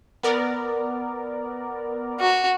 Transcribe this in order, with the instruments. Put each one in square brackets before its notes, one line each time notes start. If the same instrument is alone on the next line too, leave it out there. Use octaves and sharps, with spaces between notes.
[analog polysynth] B3 A#4 D5
[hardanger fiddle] F#4